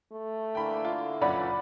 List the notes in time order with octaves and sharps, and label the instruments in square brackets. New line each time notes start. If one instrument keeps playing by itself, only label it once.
[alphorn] A3
[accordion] D3 E3 A#3 [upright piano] G5 B5
[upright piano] F4
[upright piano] F#1 C#4 [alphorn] A#2 [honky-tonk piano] D5 F#5 B5